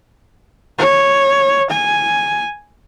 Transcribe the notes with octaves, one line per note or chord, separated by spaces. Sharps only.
C#5
G#5